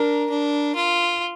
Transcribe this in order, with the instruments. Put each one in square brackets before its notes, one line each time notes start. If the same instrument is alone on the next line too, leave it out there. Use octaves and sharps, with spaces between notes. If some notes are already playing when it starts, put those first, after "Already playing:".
Already playing: [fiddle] D4 [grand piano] A#4 A#5
[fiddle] D4
F4